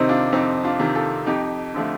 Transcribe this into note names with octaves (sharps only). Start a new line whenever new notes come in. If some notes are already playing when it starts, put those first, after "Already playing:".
Already playing: F2 C3 D#3 C4 D#4
D4 F4
F2 C4 D#4
D4 F4
C3 D#3
F4 A4
F2 D#4 G4
D3 F3 A3